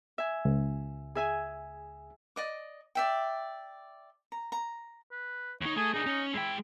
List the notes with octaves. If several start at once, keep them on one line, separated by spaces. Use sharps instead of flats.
E5 G#5
C#2
G#4 E5 G#5
D5 D#5 D6
D5 E5 G5
A#5
A#5
B4
D#2 D#4 C#5
A3 G#4
D4 D#4 G#4
C#4
G#3 E4 G5